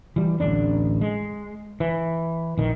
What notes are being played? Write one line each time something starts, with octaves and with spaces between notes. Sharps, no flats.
E3 G3
D1 A1 D3 D4
G#3
E3
A#1 D#3